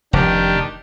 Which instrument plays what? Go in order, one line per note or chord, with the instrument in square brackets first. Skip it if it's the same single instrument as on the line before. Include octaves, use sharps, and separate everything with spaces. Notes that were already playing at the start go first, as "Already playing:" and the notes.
[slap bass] F1 [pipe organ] D#3 D4 G4